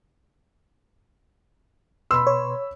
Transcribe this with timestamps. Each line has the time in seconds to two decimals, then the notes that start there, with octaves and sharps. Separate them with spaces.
2.11 B2 B4 B5 C6 E6
2.27 C#5